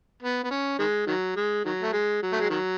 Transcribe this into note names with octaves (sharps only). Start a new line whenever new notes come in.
B3
B3
C#4
D#3 G#3
D#3 F#3
G#3
D#3 F#3
A3
G#3
F#3
A3
G#3
D#3 F#3